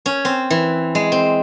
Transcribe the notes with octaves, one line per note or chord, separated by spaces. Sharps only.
C#4
C4
E3
G#3
C4